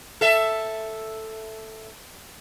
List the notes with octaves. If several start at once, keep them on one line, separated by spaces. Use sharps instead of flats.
A4 E5